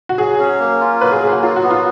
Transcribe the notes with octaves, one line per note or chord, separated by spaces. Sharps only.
F#4
F#3 G#4
C#4
A#3
F4
F#3 B4
G#4
A#3 G#4
F#4
F#3 F4
F#4
B3
F4